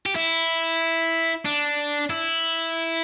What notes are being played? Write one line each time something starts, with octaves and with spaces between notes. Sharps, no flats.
G4
E4
D4
E4